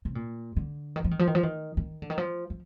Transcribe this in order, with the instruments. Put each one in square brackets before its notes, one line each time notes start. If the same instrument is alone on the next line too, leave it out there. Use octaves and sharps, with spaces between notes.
[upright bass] C3
A#2
D3
D#3
F3
D#3
F3
D#3
F3
D#3
D#3
D3
D#3
F3
F3